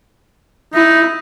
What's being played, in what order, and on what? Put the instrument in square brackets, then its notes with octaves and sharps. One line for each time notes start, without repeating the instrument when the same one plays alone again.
[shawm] D#4 [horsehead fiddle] E4